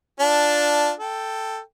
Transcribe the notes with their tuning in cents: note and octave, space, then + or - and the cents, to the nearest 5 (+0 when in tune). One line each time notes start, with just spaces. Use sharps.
D4 +0 F4 +0 A5 -5
A4 +5 G5 +0